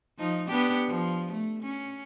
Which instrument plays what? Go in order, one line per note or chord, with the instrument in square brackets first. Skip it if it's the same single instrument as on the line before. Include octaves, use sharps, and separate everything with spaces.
[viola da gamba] F3 D#4
B3 D4 G4
F3
A3
C#4